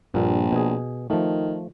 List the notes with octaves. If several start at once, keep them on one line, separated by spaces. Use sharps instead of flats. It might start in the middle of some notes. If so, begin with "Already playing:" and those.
A#1 G2 A#2
B2 G#4
D#3 F3 A3